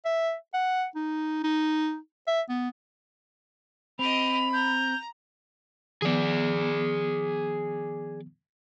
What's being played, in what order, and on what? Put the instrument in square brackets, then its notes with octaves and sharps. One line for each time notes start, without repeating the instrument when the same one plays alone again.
[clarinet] E5
F#5
D#4
D#4
E5
B3
[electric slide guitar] C4 [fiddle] G4 D#5 [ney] B5 [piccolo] F7
[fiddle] A#5 [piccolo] G6
[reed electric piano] D#3 F3 B3 [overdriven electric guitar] G#4 D5